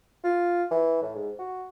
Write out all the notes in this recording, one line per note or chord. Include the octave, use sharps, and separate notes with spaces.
F4
E3
A2
G#2
F#4